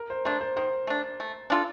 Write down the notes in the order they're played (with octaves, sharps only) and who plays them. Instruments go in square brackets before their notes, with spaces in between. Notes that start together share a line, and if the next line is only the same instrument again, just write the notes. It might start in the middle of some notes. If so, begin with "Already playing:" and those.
Already playing: [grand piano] A#4
C5
[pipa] A3 D4 [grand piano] C5
[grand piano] C5
[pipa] D#3 [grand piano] C5
[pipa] A3 D4
A3
D4 F4 A4